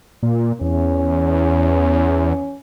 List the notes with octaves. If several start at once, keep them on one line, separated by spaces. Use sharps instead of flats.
A#2
E2 C#4